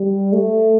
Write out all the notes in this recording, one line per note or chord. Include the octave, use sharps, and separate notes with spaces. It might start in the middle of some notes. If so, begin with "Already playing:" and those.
Already playing: G3
A3